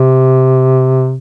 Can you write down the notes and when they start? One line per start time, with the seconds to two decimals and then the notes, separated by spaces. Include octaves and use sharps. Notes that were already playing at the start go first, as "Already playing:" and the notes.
Already playing: C3